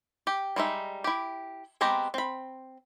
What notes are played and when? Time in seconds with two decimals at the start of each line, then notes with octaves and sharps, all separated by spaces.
0.27 G4
0.56 G3 G#3 D#4 E5
1.04 E4 G4
1.81 G#3 B3 C4 G4 A#5
2.14 C4 B5